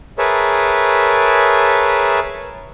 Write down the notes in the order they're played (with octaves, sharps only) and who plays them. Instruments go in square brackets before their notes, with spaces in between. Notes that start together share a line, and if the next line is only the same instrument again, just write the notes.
[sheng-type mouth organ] G#4 A#4 B4 C#5 E5 A5